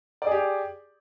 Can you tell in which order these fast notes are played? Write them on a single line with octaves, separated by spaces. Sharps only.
D5 G#4 G4